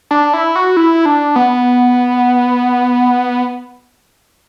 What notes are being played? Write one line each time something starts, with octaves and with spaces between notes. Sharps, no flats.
D4
E4
F#4
E4
D4
B3